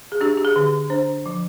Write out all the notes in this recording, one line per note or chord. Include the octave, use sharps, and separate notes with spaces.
G#4
D4 G4
G4
G#4
D3
D4 C5
F3